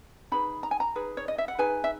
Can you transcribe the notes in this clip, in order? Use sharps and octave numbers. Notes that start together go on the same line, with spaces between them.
D#4 G#4 B4 B5
A#5
G#5
A#5
D#4 G#4 B4
C#5
D#5
E5
F#5
D#4 G#4 B4 G#5
E5